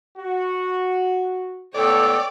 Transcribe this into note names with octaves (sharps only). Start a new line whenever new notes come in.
F#4
C#2 A2 B3 A4 C#5 D5 G5